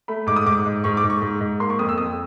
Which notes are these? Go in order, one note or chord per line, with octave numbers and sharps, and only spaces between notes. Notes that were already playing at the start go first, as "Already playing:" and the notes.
A3 B5
G#2 D6
D#6
G#2 D6
G#2
G#2 C#6
D6
G#2
C#6
G#2
G#2
A#3 C6
C#6
F2 D#6
E6
F2 D#6